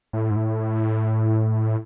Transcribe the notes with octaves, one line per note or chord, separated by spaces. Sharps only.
A2
G#2
A2